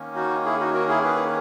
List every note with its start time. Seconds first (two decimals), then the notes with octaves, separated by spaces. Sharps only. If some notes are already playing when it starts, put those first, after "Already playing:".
Already playing: D#3 A#3 C#4
0.15 D#4 F#4
0.45 E4 G#4
0.60 D#4 F#4
0.74 F#4 A#4
0.89 E4 G#4
1.04 G#4 B4